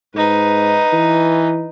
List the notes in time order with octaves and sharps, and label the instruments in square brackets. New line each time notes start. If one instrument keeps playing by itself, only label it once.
[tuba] G#2 [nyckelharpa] D#4 B4
[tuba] E3